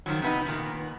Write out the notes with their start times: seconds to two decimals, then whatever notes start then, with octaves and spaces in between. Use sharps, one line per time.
0.06 D#3 F3 F#3
0.22 C3 B3 D#4
0.45 A#2 D#3 B3